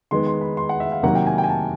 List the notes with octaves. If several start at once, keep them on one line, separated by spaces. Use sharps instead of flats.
D#3 G#3 B3 C6
C6
B5
C6
F#5
E5
F5
C3 D#3 F#3 A#3 F#5
G5
G#5
G5
G#5
A5